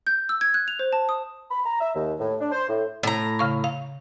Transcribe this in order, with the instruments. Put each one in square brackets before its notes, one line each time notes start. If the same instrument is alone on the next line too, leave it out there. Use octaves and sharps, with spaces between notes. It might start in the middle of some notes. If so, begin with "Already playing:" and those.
[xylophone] G6
E6
G#6
F#6
F7
C5
A5
D#6
[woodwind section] B5
A#5
E5
D#2
A2
D4
C5
A2
[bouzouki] A2 A#5
[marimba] C#3 F5 C#6
F5